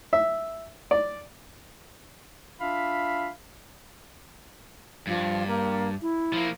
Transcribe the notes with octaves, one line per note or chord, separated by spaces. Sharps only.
E5
D5
D4 F4 E5 F5 B5
G2 F3
A#3
E4
F3 A#3